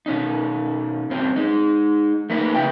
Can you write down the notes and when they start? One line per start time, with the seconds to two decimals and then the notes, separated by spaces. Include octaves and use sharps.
0.06 B2 C#4 D#4
1.10 G2 C4 C#4
1.36 G#3 D#4
2.30 A3 A#3 D#4 B4
2.54 C#3 C#4 E4 E5 F5 G5